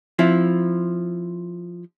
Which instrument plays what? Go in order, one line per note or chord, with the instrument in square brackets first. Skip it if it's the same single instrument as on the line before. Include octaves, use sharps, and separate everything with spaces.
[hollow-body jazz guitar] F3 C4 E4